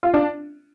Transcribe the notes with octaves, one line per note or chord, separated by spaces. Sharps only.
F4
D4